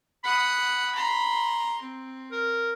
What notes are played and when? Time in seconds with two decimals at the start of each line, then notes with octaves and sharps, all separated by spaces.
0.24 F#5 B5 D#6
0.95 A#5 C6
1.81 C4
2.32 A#4